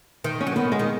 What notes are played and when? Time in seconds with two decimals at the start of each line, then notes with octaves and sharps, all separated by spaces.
0.24 D#3
0.41 C#4
0.47 F#3
0.56 D#3 B3
0.72 G#3
0.79 D#3